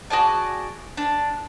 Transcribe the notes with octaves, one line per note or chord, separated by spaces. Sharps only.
F#4 G#4 D5 A5
D4